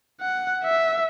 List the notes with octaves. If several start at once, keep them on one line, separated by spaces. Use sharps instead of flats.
F#5
E5